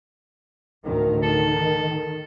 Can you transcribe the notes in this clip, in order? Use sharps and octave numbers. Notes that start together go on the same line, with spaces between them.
D2 A2 D#3
D#3 A4